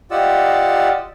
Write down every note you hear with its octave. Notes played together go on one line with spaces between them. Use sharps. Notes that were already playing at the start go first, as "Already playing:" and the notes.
F4 G4 D5 D#5 F#5 E6